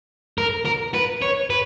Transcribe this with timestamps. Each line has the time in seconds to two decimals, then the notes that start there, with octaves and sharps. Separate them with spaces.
0.38 A#4
0.65 A#4
0.94 B4
1.22 C#5
1.50 B4